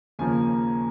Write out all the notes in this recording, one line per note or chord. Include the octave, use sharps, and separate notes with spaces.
D#2 C#3 F3 A#3 G#5